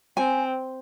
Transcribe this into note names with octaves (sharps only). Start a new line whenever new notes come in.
C4 G#5